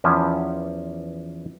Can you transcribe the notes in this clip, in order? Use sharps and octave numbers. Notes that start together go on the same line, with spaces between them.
E2 E3 F3 C#4 E5